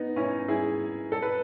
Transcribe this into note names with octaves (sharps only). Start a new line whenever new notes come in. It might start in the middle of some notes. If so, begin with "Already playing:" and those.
Already playing: B3 D#4
C#4 E4
E4 G#4
A4
B4